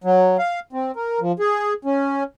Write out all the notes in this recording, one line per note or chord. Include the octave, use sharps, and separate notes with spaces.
F#3
F5
C4
A#4
F3
G#4
C#4